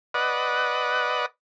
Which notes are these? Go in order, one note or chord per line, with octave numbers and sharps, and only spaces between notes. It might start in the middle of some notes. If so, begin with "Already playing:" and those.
B4 D5 D#5 F#5